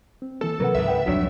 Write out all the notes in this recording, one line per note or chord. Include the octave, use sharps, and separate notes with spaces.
C4
E3 A#3 A4
C3 F#3 A#4 B4 F#5
C#2 G#2 E5
B4 F#5 G5
C2 F2 G#2 F#3 D4 C#5